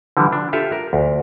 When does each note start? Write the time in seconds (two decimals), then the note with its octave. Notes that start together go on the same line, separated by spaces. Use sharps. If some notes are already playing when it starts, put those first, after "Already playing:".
0.17 D3 E3 F3 G3
0.32 D4
0.53 F4 G4 A4 E5 F5
0.72 A#4
0.93 D2